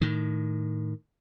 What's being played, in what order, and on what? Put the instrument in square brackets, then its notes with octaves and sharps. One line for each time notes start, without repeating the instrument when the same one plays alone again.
[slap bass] A2 D#3